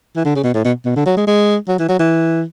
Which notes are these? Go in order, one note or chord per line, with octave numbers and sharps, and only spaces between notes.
E3
D3
C#3
B2
A2
B2
B2
D3
F#3
G#3
G#3
F#3
E3
F#3
E3